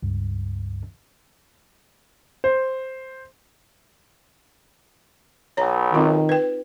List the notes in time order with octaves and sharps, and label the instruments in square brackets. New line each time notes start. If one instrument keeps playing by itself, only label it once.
[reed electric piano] C#2 G2
[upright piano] C5
[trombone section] B1 [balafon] C#5 A#5
[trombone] D#3 [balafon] C4 D#4 F4
[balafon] B4 G5